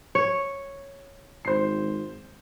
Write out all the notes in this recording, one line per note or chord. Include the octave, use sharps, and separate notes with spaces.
C#5
G#1 C5 C7